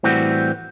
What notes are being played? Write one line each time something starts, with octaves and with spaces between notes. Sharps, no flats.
A2 E3 G3 C4 F#4